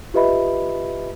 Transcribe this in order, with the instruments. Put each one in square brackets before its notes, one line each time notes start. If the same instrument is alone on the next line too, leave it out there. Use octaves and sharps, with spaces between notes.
[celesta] F4 G4 B4 D#5 E5 B5